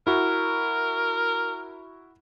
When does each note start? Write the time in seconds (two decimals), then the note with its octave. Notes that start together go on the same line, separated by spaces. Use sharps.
0.07 E4 F#4 A#4